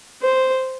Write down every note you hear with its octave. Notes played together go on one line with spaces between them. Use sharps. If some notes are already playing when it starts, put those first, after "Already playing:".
C5